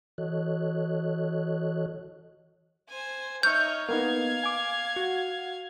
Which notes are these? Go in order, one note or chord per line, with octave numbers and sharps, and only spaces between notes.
E3 F#4 A4 C#5 D#5 F#6
C5 G#5
D#4 C#5 E5 C#6 F6 G6
A#3 B3 D#4 F5 G#6
G#5 D6
F#4